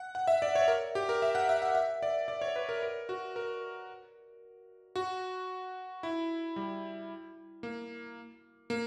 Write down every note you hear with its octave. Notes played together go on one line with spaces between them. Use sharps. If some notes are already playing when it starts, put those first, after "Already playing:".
Already playing: F#5
F#5
E5
D5
C#5
A#4
G4
A#4
E5
F#5
E5
F#5
E5
D5
D5
C#5
B4
A#4
A#4
F#4
A#4
F#4
E4
G3
A#3
A#3